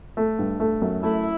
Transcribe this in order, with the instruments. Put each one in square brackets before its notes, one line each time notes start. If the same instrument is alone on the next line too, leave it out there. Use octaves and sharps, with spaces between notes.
[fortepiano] A3
G2
A3
F#2
[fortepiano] A3 [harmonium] E4